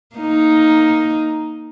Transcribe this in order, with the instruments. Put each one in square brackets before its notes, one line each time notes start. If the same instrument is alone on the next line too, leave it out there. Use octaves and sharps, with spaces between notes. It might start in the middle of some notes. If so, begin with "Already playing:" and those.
[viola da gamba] A#3 D#4